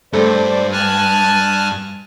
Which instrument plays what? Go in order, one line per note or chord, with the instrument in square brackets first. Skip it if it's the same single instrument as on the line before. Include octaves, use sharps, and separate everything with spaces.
[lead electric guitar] G2 [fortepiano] A3 A4 [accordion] C5 D5
[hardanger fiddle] G#5 [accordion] A5 F6 F#6